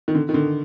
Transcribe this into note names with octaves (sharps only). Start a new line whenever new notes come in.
D#3
D3
D#3
D3